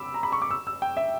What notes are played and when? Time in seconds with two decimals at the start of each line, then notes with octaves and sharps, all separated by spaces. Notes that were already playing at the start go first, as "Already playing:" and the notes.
Already playing: B5 D6 E6
0.14 A#5
0.23 B5
0.32 C#6
0.42 D6
0.51 E6
0.67 E6
0.82 G5
0.97 E5